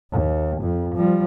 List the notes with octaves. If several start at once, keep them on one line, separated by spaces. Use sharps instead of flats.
D#2
F2
F3 G3